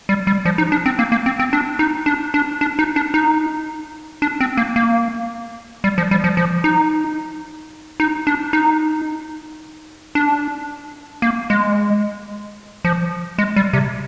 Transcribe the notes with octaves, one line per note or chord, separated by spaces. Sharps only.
G3
G3
F3
D#4
D4
C4
A#3
A#3
C4
C4
D4
D#4
D4
D4
D4
D#4
D4
D#4
D4
C4
A#3
A#3
G3
F3
G3
F3
F3
D#4
D#4
D4
D#4
D4
A#3
G#3
F3
G#3
G3
C3